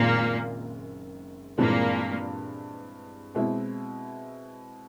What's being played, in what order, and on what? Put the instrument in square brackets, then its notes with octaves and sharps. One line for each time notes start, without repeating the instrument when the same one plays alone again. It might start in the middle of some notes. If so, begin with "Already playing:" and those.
Already playing: [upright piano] F#1 F#2 D#3 G#3 C4 [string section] A#2 A#3
[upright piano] G2 E3 G#3 C4 [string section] A#2 A#3
[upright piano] B2 G#3 C4 E4